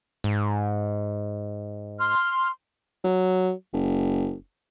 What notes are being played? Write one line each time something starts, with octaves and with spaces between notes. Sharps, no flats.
G#2
C6 F6
F#3
F#1